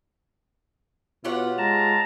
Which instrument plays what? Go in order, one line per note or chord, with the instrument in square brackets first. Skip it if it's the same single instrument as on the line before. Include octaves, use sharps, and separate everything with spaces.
[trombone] B2 [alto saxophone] F4 [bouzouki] G4 C#5 F#5
[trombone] G#3 [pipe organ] A5 A#5